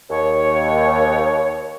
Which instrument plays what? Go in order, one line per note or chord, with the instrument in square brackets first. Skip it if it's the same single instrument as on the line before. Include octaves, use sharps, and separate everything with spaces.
[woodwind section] D#2 C#5